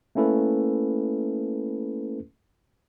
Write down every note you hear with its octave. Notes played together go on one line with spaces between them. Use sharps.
A3 A#3 C#4 E4 A4 B4